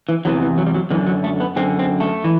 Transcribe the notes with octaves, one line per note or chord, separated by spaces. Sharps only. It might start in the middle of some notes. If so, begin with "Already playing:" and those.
E3
E2 C3 E3 F#3
E3
F#3
G3
F#3
F#2 D3 E3
F#3
A3
B3
F#2 D3 C4
C4
A3
E3